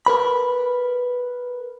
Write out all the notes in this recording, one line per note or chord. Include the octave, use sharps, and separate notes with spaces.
A#4 B4 B5